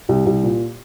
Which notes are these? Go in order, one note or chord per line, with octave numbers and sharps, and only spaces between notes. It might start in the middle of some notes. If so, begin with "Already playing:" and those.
C2
C2
A#2